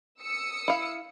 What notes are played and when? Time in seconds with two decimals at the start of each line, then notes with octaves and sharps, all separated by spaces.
0.22 D#6 E6 C#7
0.68 E4 F5